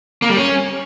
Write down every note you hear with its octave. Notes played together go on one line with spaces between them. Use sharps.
A#3
G3
C#4